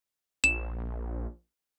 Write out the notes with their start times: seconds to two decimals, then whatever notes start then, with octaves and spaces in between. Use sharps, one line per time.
0.44 A#1 E7